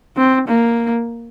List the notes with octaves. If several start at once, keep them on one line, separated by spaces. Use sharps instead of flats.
C4
A#3